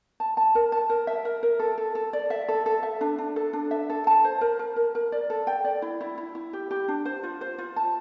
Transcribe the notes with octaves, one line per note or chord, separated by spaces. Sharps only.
A5
A5
A#4
A5
A#4
E5
A#4
A#4
A4
A4
A4
D5
E5
A4
A4
E5
D4
D4
A4
D4
E5
A4
A5
C5
A#4
A#4
A#4
A#4
D5
A4
G5
D5
E4
E4
E4
E4
G4
G4
D4
C5
F4
C5
F4
A5